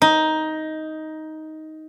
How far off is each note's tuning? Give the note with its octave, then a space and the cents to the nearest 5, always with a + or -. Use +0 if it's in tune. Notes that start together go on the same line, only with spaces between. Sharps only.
D#4 +10